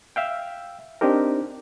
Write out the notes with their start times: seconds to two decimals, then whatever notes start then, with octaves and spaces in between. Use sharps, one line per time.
0.16 E5 F5 G5
1.01 C4 D4 D#4 G4 A#4